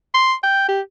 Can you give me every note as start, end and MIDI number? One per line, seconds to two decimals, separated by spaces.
0.14 0.33 84
0.43 0.67 79
0.68 0.81 67